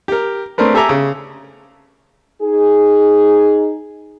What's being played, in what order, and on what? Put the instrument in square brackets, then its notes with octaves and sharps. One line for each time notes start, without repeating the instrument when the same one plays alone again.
[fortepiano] G4 A#4
A3 C4 D4 A#4 B4
G4 A4 E5 G#5 A#5 D6
C#3
[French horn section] D#4 G#4